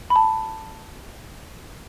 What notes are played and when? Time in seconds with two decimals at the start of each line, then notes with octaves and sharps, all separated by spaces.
0.10 B5
0.16 A5